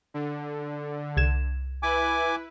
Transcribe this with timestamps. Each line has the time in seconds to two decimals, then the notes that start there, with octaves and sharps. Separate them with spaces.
0.14 D3
1.17 C2 G#6 E7
1.83 E4 B4 G#5 D6